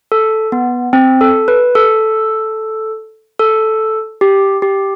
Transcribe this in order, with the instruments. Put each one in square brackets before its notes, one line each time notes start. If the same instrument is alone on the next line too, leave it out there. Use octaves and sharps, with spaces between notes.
[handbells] A4
B3
C4
A4
B4
A4
A4
G4
G4